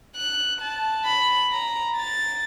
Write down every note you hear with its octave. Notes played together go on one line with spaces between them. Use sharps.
F#6
A5
B5
A#5
A6